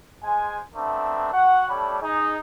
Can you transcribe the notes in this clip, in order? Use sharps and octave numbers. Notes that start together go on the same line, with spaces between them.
G#3 C5 G#5
A3 B3 C4 D4 A#4
F#4 F#5
G3 A3 D4 C#5 B5
D#4 G#4